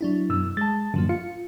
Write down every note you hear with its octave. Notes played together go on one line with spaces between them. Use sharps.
F#3 D4 E4
F#2 B2 E6
G#3 A5 A6
F#2 A2 D3 F3 A#3
F4 C#7